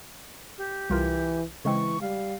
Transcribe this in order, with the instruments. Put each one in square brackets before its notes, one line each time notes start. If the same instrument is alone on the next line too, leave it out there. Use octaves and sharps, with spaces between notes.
[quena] G4
[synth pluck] C2 F4 A#4 [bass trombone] E3
[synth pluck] C#3 G#3 C4 [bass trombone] E3 [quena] C#6
[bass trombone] G3 [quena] F5